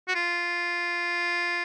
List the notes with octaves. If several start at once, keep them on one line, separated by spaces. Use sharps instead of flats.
F#4
F4